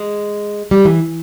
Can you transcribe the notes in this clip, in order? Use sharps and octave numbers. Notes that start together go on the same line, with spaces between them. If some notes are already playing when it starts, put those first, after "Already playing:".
Already playing: G#3
G3
E3